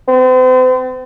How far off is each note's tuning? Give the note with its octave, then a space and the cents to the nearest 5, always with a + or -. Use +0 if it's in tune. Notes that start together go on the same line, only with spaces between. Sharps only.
C4 -40